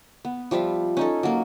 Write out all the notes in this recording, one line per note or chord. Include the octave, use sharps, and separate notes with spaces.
B3
F3 G3 F4 E5
C#4 D#4 A4
F#3 A#3